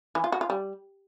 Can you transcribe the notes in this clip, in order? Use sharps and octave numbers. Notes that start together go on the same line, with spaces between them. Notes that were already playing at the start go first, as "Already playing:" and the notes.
E3
F4
F#4
F4
G3